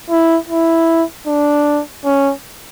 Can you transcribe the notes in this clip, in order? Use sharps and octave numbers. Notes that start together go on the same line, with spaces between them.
E4
E4
D4
C#4